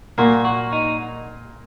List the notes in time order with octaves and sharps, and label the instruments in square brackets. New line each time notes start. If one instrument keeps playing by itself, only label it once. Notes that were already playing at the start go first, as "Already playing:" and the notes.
[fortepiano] A#2 A#3 [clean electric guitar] F#4
[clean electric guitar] F#4
D#4